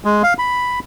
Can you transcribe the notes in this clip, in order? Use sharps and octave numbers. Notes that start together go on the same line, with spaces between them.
G#3
F5
B5